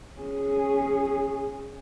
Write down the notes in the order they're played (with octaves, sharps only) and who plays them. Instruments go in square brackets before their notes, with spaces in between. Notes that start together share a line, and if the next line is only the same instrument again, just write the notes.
[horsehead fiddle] C#4 G#4